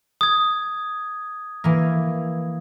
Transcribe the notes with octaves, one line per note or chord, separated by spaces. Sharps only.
D#6 G#6
E3 A#3